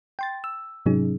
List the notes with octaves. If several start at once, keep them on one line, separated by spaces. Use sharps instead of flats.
G5 C6 A6
E6
G#2 C3 F#3 C#4 D#4 G#4